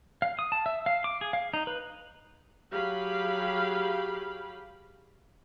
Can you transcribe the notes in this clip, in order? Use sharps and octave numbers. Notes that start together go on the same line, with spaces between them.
F5
D#6
A5
E5
F5
D6
G#4
F5
D#4
B4
F#3 G4 G#4 F5 B5